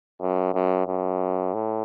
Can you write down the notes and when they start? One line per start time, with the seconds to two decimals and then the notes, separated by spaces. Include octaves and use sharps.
0.21 F#2
0.54 F#2
0.87 F#2
1.54 A2